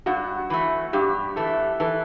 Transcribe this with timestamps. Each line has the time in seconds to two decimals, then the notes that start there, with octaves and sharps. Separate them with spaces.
0.06 G2 F#4
0.50 E3 A3
0.93 G2 G4
1.36 E3 A3 A4
1.80 E3 A4